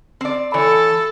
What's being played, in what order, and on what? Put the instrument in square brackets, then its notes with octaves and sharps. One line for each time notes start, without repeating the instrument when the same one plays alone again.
[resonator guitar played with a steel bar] C4 D5
[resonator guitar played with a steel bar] E3 C#5 [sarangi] A4